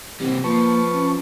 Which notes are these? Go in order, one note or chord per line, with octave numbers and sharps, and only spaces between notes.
C3 E3 G3 C4
F3 A#3 B4 A5 C#6
C#4